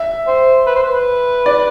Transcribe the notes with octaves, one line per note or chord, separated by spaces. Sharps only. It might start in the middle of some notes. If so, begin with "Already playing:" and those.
Already playing: E5
C5
B4
C5
B4
D5